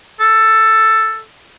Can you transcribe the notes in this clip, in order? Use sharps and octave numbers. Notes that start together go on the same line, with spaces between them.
A4